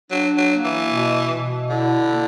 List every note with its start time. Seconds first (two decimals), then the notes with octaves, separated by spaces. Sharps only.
0.11 F#3 D4
0.38 F#3
0.51 A#3
0.64 E3
0.91 B2
1.31 B2
1.70 D3 E4
2.10 A#3